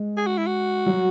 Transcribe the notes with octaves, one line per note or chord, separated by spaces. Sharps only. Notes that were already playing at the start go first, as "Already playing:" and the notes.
Already playing: G#3
G#4
F#4
E4
F#4
F#3